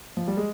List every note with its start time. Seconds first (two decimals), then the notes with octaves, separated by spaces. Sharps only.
0.17 F3
0.28 G3
0.37 G#3